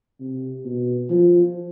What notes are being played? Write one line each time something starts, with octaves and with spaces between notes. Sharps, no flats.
C3
B2
F3